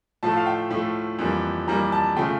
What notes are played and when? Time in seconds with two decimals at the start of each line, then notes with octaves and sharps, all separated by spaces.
0.23 A2 F3 A3 A5
0.37 F5
0.46 G5
0.71 A2 F3 A3
1.19 F2 E3 G3 A#3
1.67 F2 E3 G3 A#3 A#5
1.92 A5
2.16 C#3 F3 A3 G5